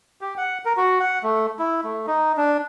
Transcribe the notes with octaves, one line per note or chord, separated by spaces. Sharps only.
G4
F#5
A#4
F#4
F#5
A3
E4
A3
D#4
D4